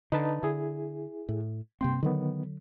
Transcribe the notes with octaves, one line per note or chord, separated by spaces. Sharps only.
D3 D#4 B4 A5
D3 E4 G#4
A2
G2 C3 A#3 C4 G5 C6
D3 D#3 F#3 B3